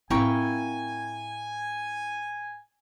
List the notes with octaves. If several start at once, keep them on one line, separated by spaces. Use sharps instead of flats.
A2 C4 E4 A#4 F5 G5 G#5 C#6